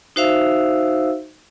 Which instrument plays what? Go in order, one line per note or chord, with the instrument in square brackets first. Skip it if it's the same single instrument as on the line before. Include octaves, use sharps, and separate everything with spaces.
[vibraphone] D#4 F#4 C5 E5 F5 E6